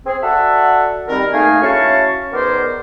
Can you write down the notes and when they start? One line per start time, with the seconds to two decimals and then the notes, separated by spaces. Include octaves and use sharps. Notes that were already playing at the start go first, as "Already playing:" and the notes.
0.05 C4 G#4
0.22 F#4 A4 D5 E5 F#5
1.09 D#3 G3 C4 A#4
1.33 A3 A#3 D#4 G#4 F5 G#5
1.62 C#4 E4 F#4 F5 A5 C#6
2.33 D#3 B3 G#4 A#4 C5 D5